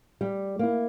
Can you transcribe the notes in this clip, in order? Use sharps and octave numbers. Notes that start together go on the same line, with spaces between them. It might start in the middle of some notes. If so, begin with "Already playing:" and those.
G3
A#3 E4